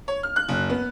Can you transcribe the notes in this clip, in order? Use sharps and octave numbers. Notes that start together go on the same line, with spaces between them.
C#5
F6
F#6
F#1
B3